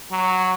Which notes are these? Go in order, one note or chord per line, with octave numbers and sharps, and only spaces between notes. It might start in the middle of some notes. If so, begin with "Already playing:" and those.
F#3